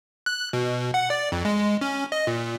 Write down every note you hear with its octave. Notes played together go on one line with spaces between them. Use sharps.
F#6
B2
F#5
D5
F2
G#3
C#4
D#5
A#2